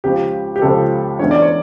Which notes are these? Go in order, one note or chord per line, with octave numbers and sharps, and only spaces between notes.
C#2 C#3 F3 G4
G4
C#2 C#3 F3 A4
E2 D3 A3 C#4 C#5
D5
C#5